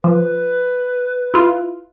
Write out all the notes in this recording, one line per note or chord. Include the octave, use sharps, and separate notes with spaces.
F3 B4
E4 F4